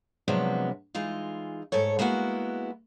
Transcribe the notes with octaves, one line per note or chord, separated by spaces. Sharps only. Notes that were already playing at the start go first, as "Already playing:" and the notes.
C3 F3 F#3 G#3 B3 D4
E3 G#3 D#4 F4
G#2 A3 A4 C#5
G#3 A#3 B3 E4 F#4